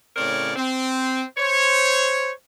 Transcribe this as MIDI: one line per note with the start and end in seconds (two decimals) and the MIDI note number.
0.17 0.55 45
0.17 0.55 49
0.17 0.55 60
0.17 0.55 70
0.17 0.55 73
0.17 0.55 74
0.56 1.23 60
1.38 2.32 72
1.38 2.32 73